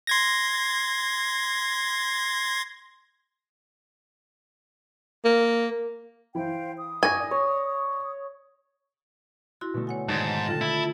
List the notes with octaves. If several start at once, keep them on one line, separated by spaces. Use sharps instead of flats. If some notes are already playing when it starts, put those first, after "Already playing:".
C6 G#6 A#6
A#3
E3 E4 C5 F5 G5
D#6
G#5 C#6 D6 A#6
D5
C#5
E4 F#4 C6 A6 A#6
B2 D3 A3
C#5 F#5 G#5
G#2 D#3 D5 A5
D3 F4 A4 G5 A#6
E4